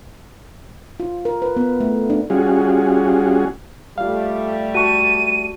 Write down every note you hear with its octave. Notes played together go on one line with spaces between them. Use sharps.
F4
A#4
B4
B3
A3
D4
G3 C#4 F4 F#4 G#4
G3 A3 F4 F5
F#4 A5 C#6 D#7